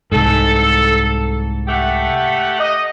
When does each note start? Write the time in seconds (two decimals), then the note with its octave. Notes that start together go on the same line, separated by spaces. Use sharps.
0.12 C2 G#2 A4
1.68 A3 G4 F#5
2.59 D#5